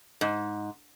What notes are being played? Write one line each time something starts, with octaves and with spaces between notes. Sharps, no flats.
G#2